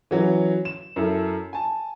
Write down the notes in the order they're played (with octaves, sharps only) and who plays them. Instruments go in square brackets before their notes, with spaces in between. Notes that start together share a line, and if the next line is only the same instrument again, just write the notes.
[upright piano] E3 F#3 C#4
E7
F#2 E4 A4
G#5 A5